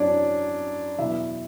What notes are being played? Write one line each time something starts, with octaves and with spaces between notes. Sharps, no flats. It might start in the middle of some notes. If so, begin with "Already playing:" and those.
Already playing: F#2 E3 D4 C#5 D5
E2 B2 F#3 E4 E5